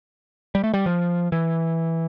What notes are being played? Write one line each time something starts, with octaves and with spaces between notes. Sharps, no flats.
G3
A3
G3
F3
E3